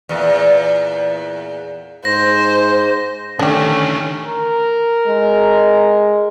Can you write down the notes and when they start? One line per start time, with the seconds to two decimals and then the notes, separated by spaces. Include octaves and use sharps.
0.09 E2 A#2
2.05 G#2 C5 A#6
3.39 D3 D#3 A3 C#4 D4 G4
4.26 A#4
5.07 G#3